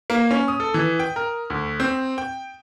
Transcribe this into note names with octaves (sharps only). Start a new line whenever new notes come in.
A#3
C#4
D#6
A4
E3
G5
A#4
D2
C4
G5